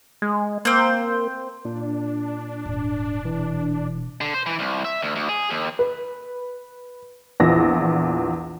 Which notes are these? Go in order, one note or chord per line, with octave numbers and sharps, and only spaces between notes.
G#3
A#3 C4 C5
A#2 D4
D#1 G#2
B2 E3
D3
C5
E3
C2
E5
D2
D2
G#4
D#2
B4
A#1 E2 E3 F3 A#6